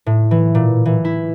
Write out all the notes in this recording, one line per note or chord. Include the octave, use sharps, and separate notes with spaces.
A2
E3
A#2
E3
E4